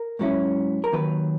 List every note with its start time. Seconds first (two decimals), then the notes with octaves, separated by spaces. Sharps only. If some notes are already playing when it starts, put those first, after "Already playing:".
Already playing: A#4
0.19 G#2 F#3 C#4 E4
0.84 A#4
0.92 D#2 D#3 F#3 B4